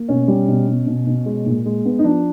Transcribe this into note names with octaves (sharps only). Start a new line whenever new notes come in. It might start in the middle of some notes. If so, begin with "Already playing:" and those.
Already playing: A#3
B2 C#4
G3
B2
B2
B2
B2
G#3
A#2
G#3
B3
D#4
F3 D4